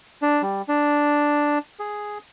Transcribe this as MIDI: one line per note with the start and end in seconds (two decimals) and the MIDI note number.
0.22 0.42 62
0.42 0.62 55
0.68 1.58 62
1.79 2.18 68